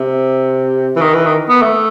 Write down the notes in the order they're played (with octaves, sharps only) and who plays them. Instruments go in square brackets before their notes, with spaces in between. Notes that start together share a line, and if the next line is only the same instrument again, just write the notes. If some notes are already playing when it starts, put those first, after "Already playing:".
Already playing: [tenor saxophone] C3
E3
D#3
E3
D#3
B3
A3